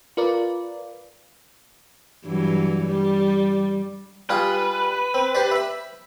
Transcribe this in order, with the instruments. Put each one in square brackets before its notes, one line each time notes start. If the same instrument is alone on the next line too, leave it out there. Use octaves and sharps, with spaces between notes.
[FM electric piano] F4 A#4 B4 D5
[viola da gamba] G2 E3 F#3
G3
[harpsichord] G3 F4 G#4 [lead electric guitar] B4
[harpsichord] C4
G4 C5 D5
E5 B5